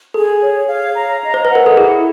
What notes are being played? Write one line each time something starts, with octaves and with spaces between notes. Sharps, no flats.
G#4 A4
C#5
F5
A#5
D#5
C5
B4
A#4 F#5
A4
E4 G#4